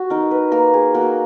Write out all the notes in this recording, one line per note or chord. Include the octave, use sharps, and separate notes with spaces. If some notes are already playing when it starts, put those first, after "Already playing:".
Already playing: F#4
D#4 A#4
B4
A#3 A#4
G#4
A#3 F#4